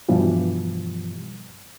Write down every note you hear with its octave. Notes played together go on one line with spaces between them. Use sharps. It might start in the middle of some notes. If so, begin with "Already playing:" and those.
G2 B2 E3 F3 G3